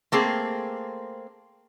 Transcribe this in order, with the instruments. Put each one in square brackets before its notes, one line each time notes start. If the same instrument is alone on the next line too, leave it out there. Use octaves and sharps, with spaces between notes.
[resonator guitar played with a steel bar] A3 A#3 C4 G#4